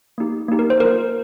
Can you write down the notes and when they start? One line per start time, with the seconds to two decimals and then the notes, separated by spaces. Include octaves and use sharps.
0.18 A#3 D#4 G4
0.48 A#3 D#4 G4
0.59 A#4
0.70 C5
0.80 A#3 F4 A#4